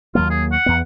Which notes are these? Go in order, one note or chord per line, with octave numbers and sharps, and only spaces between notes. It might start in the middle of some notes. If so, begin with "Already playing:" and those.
D#2 F#3 A#3 F4
G#4
F#5
E2 B3